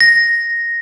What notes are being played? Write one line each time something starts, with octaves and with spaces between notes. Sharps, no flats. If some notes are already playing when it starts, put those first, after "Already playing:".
A#6